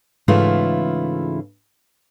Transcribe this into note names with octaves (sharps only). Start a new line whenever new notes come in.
G#2 C#3 E3 A3 E4 F4